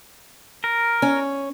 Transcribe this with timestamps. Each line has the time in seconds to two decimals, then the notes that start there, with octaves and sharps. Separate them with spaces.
0.64 A#4
1.02 C#4